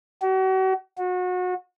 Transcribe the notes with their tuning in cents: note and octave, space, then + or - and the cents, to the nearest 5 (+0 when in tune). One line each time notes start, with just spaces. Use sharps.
F#4 +40
F#4 -30